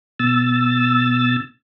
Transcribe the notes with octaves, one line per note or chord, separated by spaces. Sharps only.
B2 E6 A6